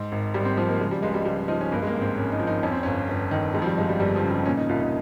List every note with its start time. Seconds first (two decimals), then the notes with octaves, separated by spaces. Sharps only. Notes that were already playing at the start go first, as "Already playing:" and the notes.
Already playing: G#2
0.12 G#1
0.34 G#1 G3
0.45 C4
0.57 F3 C4
0.68 A#3
0.80 C#3 G#3
0.91 G3
1.02 C#2 G#3
1.14 G3
1.25 C#2 G3
1.48 F3 D#4
1.61 C#4
1.72 G2 A#3
1.82 G#3
1.87 A#3
1.95 G#1
2.01 C4
2.17 G#1 C#4
2.32 D#4
2.40 F3
2.47 D#4
2.63 F2 C#4
2.72 C4
2.83 G1 C#4
3.09 G1
3.31 D#3
3.54 F2 G#3
3.62 F3
3.66 G3
3.77 G1 G#3
3.89 G3
4.00 G1 G3
4.16 F3
4.23 C#3
4.31 G3
4.45 A#2 C#4
4.57 D#4
4.69 C2 F4
4.80 D#4